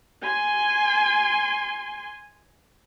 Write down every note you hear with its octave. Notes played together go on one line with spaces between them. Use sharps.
G#5 C6